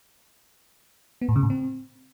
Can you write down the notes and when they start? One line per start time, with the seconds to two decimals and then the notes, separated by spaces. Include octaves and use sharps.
1.21 B3
1.29 A2
1.36 C#3
1.43 A2
1.50 C4